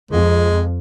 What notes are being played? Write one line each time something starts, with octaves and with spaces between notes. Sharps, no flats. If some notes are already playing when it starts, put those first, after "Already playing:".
F2 G#3